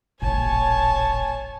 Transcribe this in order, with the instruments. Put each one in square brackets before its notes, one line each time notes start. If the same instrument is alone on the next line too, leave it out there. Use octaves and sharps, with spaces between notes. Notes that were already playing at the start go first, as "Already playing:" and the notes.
[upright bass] D#1 A1 [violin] C#5 G#5 [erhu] A5